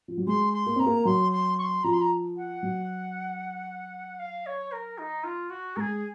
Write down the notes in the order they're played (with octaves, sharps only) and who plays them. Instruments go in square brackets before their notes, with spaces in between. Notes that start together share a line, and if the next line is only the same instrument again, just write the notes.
[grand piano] F3
F#3
[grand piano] G#3 [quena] C6
[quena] C6
[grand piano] A#3
[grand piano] C4 [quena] A#5
[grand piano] A#3
[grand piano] F#3 [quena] C6
[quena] C6
C#6
C6
[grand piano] F3 [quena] A#5
[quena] C6
A#5
F#5
[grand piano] F#3
[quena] F5
C#5
A#4
D#4
F4
F#4
[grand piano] G#3 [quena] G#4 A#4